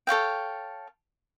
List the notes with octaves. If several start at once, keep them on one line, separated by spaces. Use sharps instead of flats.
A4 C#5 F5 G5